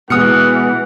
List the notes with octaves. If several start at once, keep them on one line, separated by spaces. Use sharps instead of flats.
B2 E3 G#3 F#5 D#6 F6 C#7